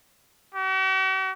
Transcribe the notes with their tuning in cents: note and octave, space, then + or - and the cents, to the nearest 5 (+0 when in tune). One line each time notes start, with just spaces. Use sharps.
F#4 +45